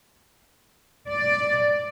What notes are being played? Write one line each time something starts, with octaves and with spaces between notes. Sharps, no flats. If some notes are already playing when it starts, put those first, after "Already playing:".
D5